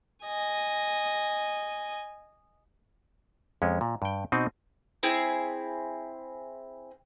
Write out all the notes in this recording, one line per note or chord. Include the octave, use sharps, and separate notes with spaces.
D#5 G#5
F2 G#3 C#4
A#2
G2 G5
B2 C4 D#4
C4 E4 G#4